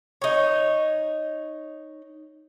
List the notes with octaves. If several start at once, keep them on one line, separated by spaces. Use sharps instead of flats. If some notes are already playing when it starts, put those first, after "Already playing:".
D#4 C#5